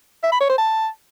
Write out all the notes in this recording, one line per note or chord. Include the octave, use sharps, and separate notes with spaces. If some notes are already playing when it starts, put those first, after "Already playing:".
E5
B5
C#5
C5
A5